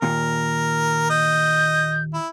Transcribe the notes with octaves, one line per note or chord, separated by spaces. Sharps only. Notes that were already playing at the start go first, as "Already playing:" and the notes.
D#2 A#2 A#4
D#5 G6
E4